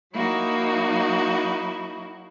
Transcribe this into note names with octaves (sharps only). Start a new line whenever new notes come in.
F#3 A#3 D#4 E4 F#4